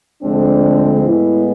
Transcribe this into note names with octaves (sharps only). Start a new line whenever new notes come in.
D2 D3 F3 G#3 C4 D4
A2 G#3 B3 E4